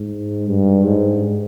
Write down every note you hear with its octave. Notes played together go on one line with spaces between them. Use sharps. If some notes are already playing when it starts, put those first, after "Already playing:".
Already playing: G#2
G2
G#2